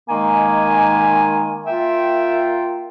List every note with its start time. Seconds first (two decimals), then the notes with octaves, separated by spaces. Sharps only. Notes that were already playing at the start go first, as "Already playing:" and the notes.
0.09 D#3 G#3 A#3 G#5
1.66 A#3 F4 E5 G5